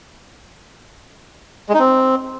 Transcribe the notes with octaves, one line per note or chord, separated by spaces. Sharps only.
G#3
D#4
C4